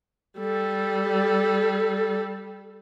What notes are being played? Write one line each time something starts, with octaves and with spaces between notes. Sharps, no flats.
G3 A4